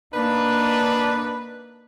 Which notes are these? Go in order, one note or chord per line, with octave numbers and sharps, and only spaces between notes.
A#3 D4 D#4 B4